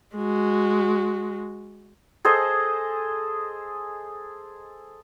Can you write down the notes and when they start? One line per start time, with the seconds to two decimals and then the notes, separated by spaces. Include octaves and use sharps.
0.15 G#3 F#4
2.25 G#4 A4 C5 D#5